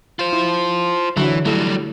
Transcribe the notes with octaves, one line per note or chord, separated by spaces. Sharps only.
F4 C5
E4
D3 E3 F#3
F#3 G3 A3 E4 A4